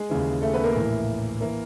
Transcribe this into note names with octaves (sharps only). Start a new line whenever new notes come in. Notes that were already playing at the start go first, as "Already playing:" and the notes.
Already playing: G#3 G#4
D#2 C#3 E3
A3 A4
B3 B4
A#3 A#4
A#1 A2 E3
E3 A#3 A#4